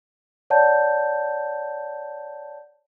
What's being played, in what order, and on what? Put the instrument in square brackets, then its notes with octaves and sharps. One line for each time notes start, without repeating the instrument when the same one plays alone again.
[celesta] C#5 D5 F#5 A5 G6